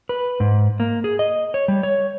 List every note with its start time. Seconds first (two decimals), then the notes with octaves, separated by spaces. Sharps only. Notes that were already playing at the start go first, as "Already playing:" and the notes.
0.09 B4
0.40 G#2
0.80 A#3
1.04 G#4
1.19 D#5
1.54 C#5
1.68 G3
1.83 C#5